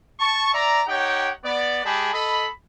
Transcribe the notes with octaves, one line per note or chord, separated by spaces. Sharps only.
A5 C#6
D5 E5 A#5
D#4 G4 C#5 F#5 G5
B3 D5
G#3 G4 G#4 A5 B5
A4 D#5 B5